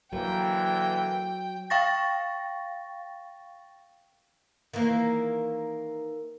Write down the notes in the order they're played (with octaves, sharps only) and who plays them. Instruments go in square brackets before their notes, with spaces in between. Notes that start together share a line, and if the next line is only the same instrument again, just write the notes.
[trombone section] D3 E3 A#3 [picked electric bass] F#3 [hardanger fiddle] G5
[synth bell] F5 G5 C#6 A6 A#6
[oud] D#3 E3 A#3